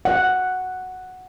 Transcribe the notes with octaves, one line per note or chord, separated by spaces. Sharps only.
F#5